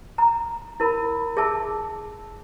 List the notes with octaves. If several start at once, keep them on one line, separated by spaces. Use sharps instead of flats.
A#5
E4 A#4 B5
G#4 E5 A5 E6